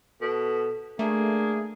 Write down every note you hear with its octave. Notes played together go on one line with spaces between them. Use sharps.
B2 A4
A3 A#3 D4 G#4